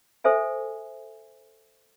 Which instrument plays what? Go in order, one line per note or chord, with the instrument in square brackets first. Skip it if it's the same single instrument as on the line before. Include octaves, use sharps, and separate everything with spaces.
[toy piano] A4 C5 E5 G#5